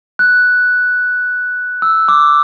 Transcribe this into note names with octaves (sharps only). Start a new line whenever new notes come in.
F#6
E6
D6